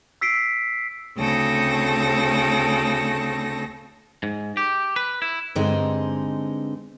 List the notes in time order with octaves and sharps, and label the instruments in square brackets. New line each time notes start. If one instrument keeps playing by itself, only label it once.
[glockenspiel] E6 B6 C7 D7
[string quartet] D2 C#3 C4 A4 A#6
[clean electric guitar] G#2
G4
B4
E4
[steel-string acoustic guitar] G2 D3 G#3 C4 D#4